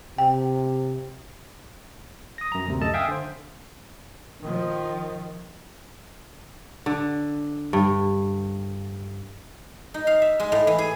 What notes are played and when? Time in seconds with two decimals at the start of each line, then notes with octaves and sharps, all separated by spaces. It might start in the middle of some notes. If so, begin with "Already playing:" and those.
0.18 C3 G5
2.38 D#6 A#6
2.52 F#2 A#5
2.68 D2 C3
2.81 F#2 A4 D#5 A5
2.94 E5 F5 G5 G#5 D#6
3.08 D3 C5
4.41 D#3 F3
6.86 D3
7.73 G2
9.94 D#4
10.07 F5
10.22 E5
10.40 G#3
10.52 A2
10.67 E3
10.78 G#4